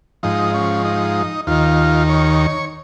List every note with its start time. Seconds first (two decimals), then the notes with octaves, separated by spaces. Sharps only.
0.23 G#2 F3 D#4
0.54 C#4
0.85 D#4
1.47 D#2 D#3 F4
2.09 C#5